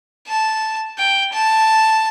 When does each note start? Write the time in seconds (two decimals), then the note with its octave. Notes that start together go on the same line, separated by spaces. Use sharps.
0.27 A5
0.98 G5
1.33 A5